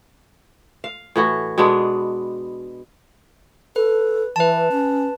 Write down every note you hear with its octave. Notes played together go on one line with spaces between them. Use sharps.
F5
A2 E3 F#4
B2 G#3 B3 D4
A4 B4
E3 B4 A5
C#4